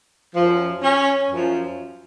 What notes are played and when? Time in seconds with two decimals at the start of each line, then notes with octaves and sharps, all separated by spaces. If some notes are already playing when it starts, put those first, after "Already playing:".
0.35 F#2 F3
0.83 C#4
1.31 F#2 F3